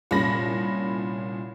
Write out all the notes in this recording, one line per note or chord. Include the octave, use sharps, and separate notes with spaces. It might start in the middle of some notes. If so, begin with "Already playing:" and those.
C2 A#2 C#4 B5 A#6